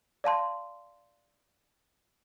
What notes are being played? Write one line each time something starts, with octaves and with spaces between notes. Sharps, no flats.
D5 F5 A5 C6